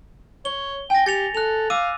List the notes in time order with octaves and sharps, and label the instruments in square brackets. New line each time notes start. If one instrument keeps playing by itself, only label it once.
[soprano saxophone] C#5 [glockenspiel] G7
[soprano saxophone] G5 [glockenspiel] G#5 A#6
[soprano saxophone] G4 [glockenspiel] A6 C#7 F7
[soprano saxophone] A4 [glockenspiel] F#6 F7
[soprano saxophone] F5 [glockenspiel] D6 E6 D#7